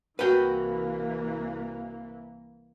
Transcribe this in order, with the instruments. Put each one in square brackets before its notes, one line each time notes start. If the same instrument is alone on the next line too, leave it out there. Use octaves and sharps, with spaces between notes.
[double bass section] C2 E3 A#3 [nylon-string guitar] F#4 A#4 F#5 [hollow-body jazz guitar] B4 G5